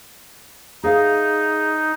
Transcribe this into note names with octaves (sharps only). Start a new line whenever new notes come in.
D#4 G#4 E5 F5